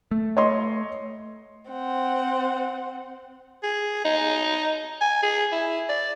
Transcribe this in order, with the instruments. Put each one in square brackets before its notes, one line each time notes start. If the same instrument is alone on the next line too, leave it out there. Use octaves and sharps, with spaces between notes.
[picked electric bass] A3
[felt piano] C#5 D#5 C6
[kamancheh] C4 F#5
[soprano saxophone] G#4
D#4
G#5
G#4
E4
D5